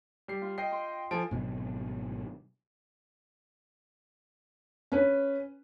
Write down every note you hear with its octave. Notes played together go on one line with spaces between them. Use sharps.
G3 C7
F4
D#5 G5 C7
C6
F3 A4 G#5 D7
G#1 B2 F#3
C#4 B4